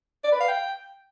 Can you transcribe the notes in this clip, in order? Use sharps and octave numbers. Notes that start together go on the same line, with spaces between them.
D5
B4
F5
G5